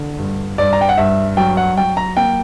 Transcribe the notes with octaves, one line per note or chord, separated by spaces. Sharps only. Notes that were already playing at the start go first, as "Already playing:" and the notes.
Already playing: D3
G2
G2 D5
A#5
G5
F#5
G2 E5
F#3 G5
F#5
F#3 G5
A#5
A#3 G5